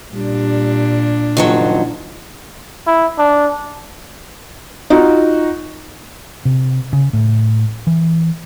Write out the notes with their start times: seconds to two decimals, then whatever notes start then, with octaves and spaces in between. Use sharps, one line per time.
0.14 A#2 G3 D4
1.37 F#1 D#3 F3 F#3
2.87 E4
3.18 D4
4.90 D#4 F4 F#4
6.45 C3
6.93 C#3
7.13 A2
7.87 E3